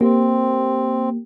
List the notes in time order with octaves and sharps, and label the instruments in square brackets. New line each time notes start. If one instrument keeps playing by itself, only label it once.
[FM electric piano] A#3 G4 [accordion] C4